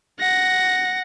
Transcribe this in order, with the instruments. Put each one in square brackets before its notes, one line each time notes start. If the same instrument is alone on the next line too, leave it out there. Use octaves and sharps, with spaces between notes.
[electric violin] F#5 A#6